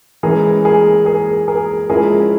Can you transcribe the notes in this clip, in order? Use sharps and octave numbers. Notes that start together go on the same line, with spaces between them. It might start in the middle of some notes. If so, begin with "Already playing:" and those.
E3 G#3 C#4 E4 G#4 A#4
G#4 A#4
G#4 A#4
G#4 A#4
F3 G#3 C#4 E4 G#4 A#4